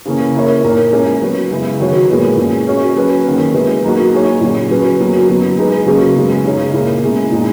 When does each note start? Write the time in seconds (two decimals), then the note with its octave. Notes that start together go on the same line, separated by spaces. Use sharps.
0.05 C#3 E3 A#3 C#4
0.35 A#3 E4 A#4 C#5
0.64 A#2 A#3 D#4 A#4
0.92 G#3 C#4 G#4 C#5
1.22 F#3 B3 F#4
1.51 C#3 G#3 B3 E4
1.80 D#3 F#3 B3 F#4 C#5
2.09 A#2 G#3 B3 F#4 A#4
2.37 A#2 G#3 C#4
2.67 A#3 C#4 F#4 C#5
2.96 F#3 C#4 G#4 B4
3.25 D#3 A#3 C#4
3.53 B2 G#3 B3 E4 B4
3.83 F#3 A#3 D#4 F#4
4.12 A#3 D#4 G#4 C#5
4.41 A#2 F#3 C#4 F#4
4.70 F#3 C#4 G#4 B4
5.00 B2 F#3 A#3 C#4 F#4
5.28 B2 F#3 B3
5.57 G#3 D#4 G#4 B4
5.86 C#3 F#3 A#3 C#4 G#4
6.16 B2 G#3 B3
6.45 C#3 G#3 D#4 G#4 C#5
6.73 A#2 A#3 E4
7.03 B2 G#3 C#4 E4 G#4
7.32 A#2 G#3 D#4